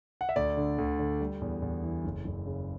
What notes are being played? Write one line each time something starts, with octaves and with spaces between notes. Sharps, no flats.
F#5
E5
D2 D5
D3
D2
D3
G3
E2
E2
E3
F#1
F#1
C#3